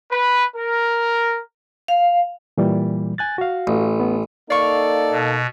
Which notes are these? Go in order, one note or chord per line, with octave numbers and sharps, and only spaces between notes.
B4
A#4
F5
A#2 E3 G3
G#5 F#6 A6
F#4 F5
A1
B3
A#3 D#4 A4 D5 F5 C#6
B2